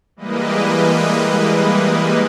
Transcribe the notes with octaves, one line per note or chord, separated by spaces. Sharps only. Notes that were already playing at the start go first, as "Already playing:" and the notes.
E3 G3 G#3 A#3 B4 D#5